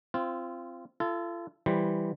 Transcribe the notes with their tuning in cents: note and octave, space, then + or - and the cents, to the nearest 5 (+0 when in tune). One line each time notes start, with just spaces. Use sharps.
C4 +0 F4 -25
F4 -40 A4 +0
E3 +0 G3 +0 C5 +0